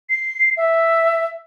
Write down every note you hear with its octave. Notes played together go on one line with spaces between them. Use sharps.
C7
E5